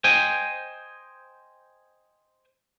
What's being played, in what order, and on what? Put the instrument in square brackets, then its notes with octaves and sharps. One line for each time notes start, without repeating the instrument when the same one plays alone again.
[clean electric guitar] C5 D#5 G5 G#5